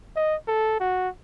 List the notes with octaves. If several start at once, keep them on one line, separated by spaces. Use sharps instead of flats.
D#5
A4
F#4